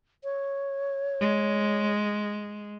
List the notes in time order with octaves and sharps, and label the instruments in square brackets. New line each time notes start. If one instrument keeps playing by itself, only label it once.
[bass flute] C#5
[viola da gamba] G#3